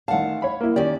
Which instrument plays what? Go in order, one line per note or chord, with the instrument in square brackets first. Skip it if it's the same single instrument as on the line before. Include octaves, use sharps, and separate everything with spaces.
[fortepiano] A1 D#3 A5 [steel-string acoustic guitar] F5 F#5
[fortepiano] C#5 B5
A#3 E4
[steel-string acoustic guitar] D#3 C#4 D5 [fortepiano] G4